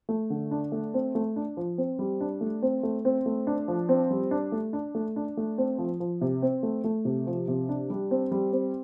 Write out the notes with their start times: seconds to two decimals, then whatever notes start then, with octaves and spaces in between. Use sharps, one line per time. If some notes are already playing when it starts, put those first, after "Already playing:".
0.09 A3
0.30 D3
0.51 D4
0.72 A3
0.94 C4
1.15 A3
1.36 D4
1.57 F3
1.78 C4
1.99 G3
2.21 D4
2.41 A3
2.62 C4
2.83 A3
3.05 C4
3.26 A3
3.47 D4
3.68 F3
3.89 C4
4.11 G3
4.31 D4
4.52 A3
4.73 D4
4.95 A3
5.16 D4
5.37 A3
5.58 C4
5.78 F3
6.00 F3
6.21 C3
6.42 C4
6.63 A3
6.84 A3
7.05 C3
7.27 F3
7.48 C3
7.69 D4
7.90 G3
8.11 C4
8.32 G3
8.53 C4